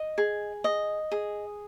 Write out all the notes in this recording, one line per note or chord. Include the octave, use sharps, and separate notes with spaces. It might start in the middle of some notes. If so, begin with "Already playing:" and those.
Already playing: D#5
G#4
D#5
G#4